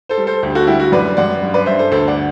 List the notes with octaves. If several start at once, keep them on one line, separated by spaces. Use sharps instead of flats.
A4 C5
G3
A4 C5
D2 G4
F#4 A4
G3 E4 G4
F#4
F#2 B4 D5
F#2 D5 F#5
G2
B4 D5
G2 C5 E5
A4 C5
D2 A4 C5
D5 F#5